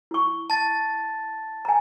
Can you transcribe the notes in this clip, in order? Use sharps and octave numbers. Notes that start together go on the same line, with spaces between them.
E4 C#6
A5 A6
G#5 A#5